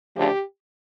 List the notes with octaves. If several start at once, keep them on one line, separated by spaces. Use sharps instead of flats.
D2 C#3 F3 A3 D4 G4